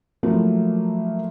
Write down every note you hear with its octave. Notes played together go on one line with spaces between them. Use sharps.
F3 F#3 A3 A#3 E4